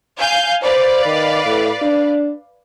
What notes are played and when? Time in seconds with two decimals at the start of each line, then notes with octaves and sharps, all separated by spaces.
0.19 F5 G#5 G6
0.62 B4 C5 D5 F5
1.05 D#3
1.46 A2
1.82 D4